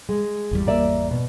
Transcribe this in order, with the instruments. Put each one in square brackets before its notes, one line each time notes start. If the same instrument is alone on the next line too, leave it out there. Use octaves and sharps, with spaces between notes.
[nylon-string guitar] G#3
[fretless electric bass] G#1 E2 G3
[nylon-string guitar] A#3 D5 E5
B2